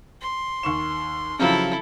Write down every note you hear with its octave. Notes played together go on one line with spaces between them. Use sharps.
C6
D#2 C#6 E7
C#3 F3 F#3 E4 A4